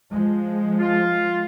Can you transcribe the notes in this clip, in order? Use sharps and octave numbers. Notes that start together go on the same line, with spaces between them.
F3 G#3
F4